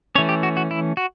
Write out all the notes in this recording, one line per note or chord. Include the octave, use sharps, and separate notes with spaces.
E3 A3 C#4 C#5
G4
F#4
F#4
E4
F#4